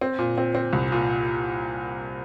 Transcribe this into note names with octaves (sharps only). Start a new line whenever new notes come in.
C4
A#2
C4
C4
C2
A#2